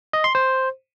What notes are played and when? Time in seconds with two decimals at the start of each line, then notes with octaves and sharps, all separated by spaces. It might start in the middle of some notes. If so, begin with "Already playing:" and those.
0.13 D#5
0.24 C6
0.35 C5